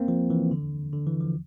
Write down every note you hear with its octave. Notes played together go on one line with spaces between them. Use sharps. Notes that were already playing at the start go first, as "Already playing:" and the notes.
Already playing: A#3 C4
F3
E3
D3
D3
E3
F3